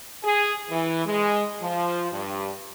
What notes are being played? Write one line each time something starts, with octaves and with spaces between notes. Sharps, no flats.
G#4
E3
G#3
F3
G2